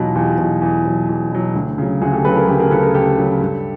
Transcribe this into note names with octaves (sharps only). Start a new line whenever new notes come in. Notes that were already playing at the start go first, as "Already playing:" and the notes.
Already playing: E2 B2 F#3 D#4 F4
E2 F4 G4
B2 F#3
E2
B2 F#3
E2
B2 F#3
D2
C#3 F#3
D2 F#4 G#4
G4 A4
C#3 F#3 A4 B4
G#4 A#4
D2 G4 A4
G#4 A#4
C#3 F#3 A4 B4
G#4 A#4
D2 G4 A4
C#3 F#3
G2